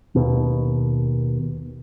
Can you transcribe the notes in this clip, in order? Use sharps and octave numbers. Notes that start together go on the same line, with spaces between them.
D#2 B2